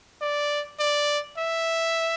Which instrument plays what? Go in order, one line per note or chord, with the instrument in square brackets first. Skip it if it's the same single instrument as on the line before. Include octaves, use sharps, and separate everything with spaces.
[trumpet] D5
D5
E5